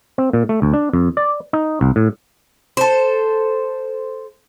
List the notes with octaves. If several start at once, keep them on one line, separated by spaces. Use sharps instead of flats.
C4
A#2
A3
D2
D4
F2
D5
D#4
C2
A2
A4 C5